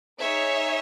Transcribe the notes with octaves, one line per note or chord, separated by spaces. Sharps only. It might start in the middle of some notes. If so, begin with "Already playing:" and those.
D#4 G#4 C#5 E5